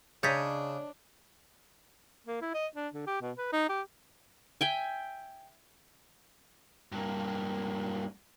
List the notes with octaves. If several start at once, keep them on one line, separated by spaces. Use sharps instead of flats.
C#3 D4 C#5 D#5 A#5 G6 A6 B6
A#3
E4
D#5
D4
D3
G4
B2
B4
D#4
G4
E5 G5 G#5
G2 A#3